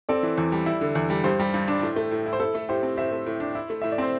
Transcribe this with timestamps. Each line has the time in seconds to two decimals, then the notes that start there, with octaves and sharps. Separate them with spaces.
0.09 C4 A4 D5
0.23 E3
0.38 E2
0.52 G3
0.66 E4
0.81 D3
0.95 E2
1.10 G3
1.24 G2 G4 C5
1.39 G3
1.54 G2
1.68 D4
1.82 A2
1.96 A3
2.11 A2
2.26 E4
2.33 C5
2.40 E4 A4
2.55 A3
2.69 A2 G4 C5
2.83 C4
2.97 A2 C5 E5
3.12 A3
3.27 A2
3.40 D4
3.55 E4
3.70 A3
3.82 A2 E5
3.92 D5
3.98 C4 C5